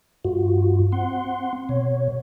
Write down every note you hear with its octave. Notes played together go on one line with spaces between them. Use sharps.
G2 F4 F#4
C4 F#5 C6
B2 C#5